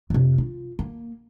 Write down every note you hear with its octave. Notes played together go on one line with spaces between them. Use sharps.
F2 C3
F4
A#3